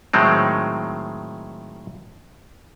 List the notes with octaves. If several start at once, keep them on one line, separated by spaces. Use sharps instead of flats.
A2 D#3 F#3 G#3 C4